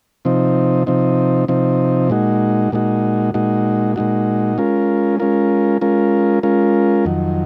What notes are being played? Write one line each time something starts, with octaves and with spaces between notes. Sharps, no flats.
C3 F3 C4 D#4
C3 F3 C4 D#4
C3 F3 C4 D#4
A#2 G#3 D#4 F#4
A#2 G#3 D#4 F#4
A#2 G#3 D#4 F#4
A#2 G#3 D#4 F#4
G#3 C#4 F4 A#4
G#3 C#4 F4 A#4
G#3 C#4 F4 A#4
G#3 C#4 F4 A#4
F2 D#3 F#3